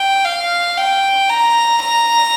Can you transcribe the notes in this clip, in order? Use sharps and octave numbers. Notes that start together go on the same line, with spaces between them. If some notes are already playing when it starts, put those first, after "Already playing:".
Already playing: G5
F5
G5
A#5
A#5